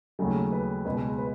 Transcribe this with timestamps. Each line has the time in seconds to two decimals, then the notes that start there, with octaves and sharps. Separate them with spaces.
0.19 D#2 C#3 F#3 A3 G#4
0.52 B4
0.85 C#2 B2 G#3 B4
1.18 B4